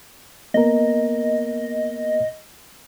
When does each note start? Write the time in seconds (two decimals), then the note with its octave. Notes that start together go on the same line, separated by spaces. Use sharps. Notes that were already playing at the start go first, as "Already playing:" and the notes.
0.54 A#3 B3 A#4 D#5